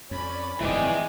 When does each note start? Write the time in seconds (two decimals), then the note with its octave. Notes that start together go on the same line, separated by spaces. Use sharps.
0.11 F2 C#4 D5 B5
0.60 F1 G2 D#3 E3 G#3 D5 G5 G#5